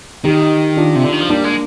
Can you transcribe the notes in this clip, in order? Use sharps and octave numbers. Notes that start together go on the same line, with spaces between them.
D#3 D#4 G4
D4 F4
C3
D3
D#3
F3
G3 A#3 D4
G#3